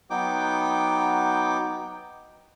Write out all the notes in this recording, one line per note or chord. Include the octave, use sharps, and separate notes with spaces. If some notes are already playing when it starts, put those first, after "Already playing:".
F#3 B3 D#4 G5 D6